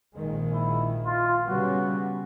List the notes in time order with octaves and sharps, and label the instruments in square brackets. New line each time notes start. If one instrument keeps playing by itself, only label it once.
[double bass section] A#1 D#3 G#3
[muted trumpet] E4
F4
[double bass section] C#3 G3 B3 [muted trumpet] F#4